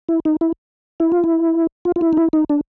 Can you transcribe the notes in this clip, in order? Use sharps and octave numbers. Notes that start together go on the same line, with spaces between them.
E4
D#4
E4
E4
F4
E4
F4
F4
E4
D#4
E4
D#4
D4